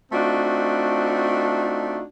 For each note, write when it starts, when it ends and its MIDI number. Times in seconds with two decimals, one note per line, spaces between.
0.12 2.02 57
0.12 2.02 60
0.12 2.02 62
0.12 2.02 63
0.12 2.02 65
0.12 2.02 66